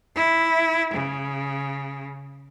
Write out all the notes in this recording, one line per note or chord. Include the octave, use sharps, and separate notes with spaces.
E4
C#3